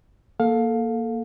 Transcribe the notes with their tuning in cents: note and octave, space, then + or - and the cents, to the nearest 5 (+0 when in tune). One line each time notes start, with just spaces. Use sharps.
A#3 +0 A4 +0 F5 +20